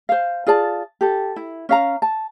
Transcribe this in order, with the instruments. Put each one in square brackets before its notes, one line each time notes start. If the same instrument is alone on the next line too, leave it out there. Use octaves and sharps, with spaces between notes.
[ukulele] C5 F5
F4 G#4 D5 A5
G4 A4
E4
C#4 F5 A#5
A5